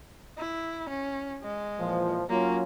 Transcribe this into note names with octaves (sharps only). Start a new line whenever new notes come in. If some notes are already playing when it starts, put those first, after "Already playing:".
E4
C#4
G#3
A#2 E3 F3
F#3 A#3 C#4 F4